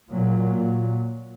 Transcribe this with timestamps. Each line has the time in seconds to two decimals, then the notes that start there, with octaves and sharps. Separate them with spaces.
0.11 A#2 F#3